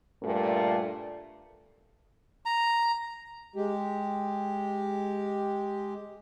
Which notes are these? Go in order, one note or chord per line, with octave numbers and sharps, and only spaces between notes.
G2 A#2 A3
A#5
G#3 G4